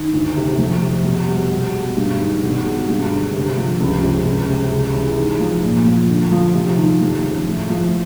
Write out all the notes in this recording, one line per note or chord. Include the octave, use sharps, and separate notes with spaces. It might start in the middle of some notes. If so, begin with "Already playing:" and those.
Already playing: D#3
D2
C3
F2
C3
B2
G3
B2
G#3
G2
D#3
B2
G#3
G2
D3
C3
F3
C#2
C3
C#2
C3
C#3
E3
G#2
F3
A#2
F3
D3
F3
C3
D#3
F2
C#3
A2
F3